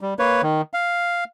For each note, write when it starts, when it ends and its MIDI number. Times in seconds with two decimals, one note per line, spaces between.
0.01 0.14 55
0.19 0.42 58
0.19 0.42 71
0.19 0.42 73
0.43 0.62 51
0.73 1.24 77